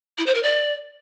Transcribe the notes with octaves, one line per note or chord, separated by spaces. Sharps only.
E4
C5
A#4
D5